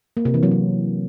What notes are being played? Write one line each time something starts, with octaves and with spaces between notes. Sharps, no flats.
A#3
C3
E3
F#3
C3